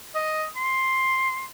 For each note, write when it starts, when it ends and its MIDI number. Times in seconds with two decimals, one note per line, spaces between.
0.15 0.45 75
0.56 1.45 84